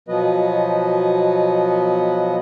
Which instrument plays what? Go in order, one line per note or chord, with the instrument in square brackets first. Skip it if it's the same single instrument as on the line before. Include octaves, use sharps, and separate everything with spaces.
[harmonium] B2 F3 F#3 B3 B4 D#5